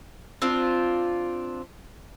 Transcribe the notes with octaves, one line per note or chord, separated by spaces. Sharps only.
C4 D4 F4